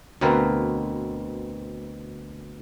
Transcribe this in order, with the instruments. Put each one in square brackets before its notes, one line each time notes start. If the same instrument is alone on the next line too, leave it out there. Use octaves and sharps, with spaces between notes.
[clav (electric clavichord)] D2 B2 C4 A#4 B4 F5